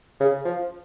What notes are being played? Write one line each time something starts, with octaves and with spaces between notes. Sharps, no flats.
C#3
F3